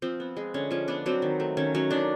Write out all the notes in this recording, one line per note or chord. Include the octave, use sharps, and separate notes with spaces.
F3 C4
B3
G#3
D3 C#4
F3 C#4
B3 D4
F#3 C4
D#3
A3
D#3 C#4
F#3 C#4
D#3 D4